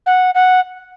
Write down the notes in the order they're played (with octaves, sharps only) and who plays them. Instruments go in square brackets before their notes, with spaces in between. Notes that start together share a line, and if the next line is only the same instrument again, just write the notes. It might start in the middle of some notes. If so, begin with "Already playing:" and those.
[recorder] F#5
F#5